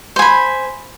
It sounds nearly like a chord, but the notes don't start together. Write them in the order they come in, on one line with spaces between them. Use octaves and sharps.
C5 G#5 B5